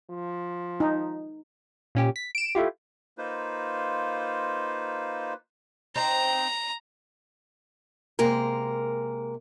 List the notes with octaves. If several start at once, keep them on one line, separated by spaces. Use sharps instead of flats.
F3
D#4
A#2 C#4 G4
B6
D7 E7
A3 E4 F4 G4
A#3 D#4 F4 B4 C5
C4 D#4 A#5
C3 G#3 A#3 A#4